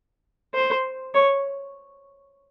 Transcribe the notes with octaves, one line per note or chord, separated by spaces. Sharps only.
C5
C#5